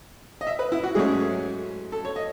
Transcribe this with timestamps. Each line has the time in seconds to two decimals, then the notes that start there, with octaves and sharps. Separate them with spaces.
0.41 D#5
0.47 E5
0.59 B4
0.72 E4
0.83 F#4
0.95 G#2 F#3 A3 C#4 G#4
1.92 A4
2.05 C#5
2.16 D#5